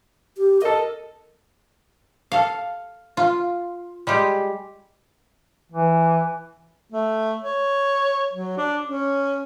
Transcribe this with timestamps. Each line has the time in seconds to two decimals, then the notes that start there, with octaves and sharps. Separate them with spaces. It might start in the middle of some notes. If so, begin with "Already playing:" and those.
0.37 G4
0.62 A4 A#4 D#5
2.32 A4 F5
3.17 F4
4.07 G3 G#3 G4
5.72 E3
6.92 A3
7.42 C#5
8.33 F#3
8.57 D4
8.86 C#4